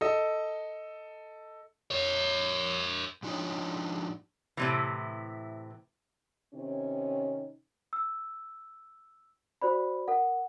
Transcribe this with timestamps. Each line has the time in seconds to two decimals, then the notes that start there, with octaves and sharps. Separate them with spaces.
0.01 A4 D#5
1.91 A#4 C#5
3.23 G#2 F3 D4 D#4 C#5
4.57 A2 C3 E3
6.54 C3 D#3 C4 C#4
7.93 E6
9.62 F#4 C5 D5 B5
10.08 A#4 F#5